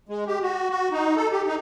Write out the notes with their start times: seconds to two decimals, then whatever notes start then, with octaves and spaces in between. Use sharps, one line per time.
0.09 G#3
0.27 G4
0.42 F#4
0.70 F#4
0.92 D#4
1.16 A4
1.32 G4
1.47 D#4